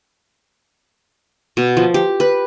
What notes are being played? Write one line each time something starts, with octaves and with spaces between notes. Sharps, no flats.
B2
F3
G4
B4